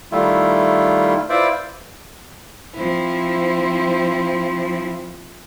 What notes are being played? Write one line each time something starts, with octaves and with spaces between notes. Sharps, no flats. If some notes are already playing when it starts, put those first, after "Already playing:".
D#3 G3 A3 E4 F4
E4 F4 B4 C5 D5 E5
F3 C4 E4